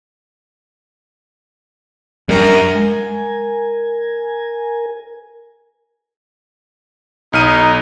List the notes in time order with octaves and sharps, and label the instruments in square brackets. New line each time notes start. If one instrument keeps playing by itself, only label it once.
[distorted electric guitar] F#2 [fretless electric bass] G3 G#3 D4 [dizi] A#4
[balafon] G#3 [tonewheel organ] A#4 G#5
[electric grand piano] B1 F6 D#7 [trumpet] D#4